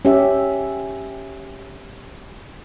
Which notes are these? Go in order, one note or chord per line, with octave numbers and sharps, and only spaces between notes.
C#4 G4 E5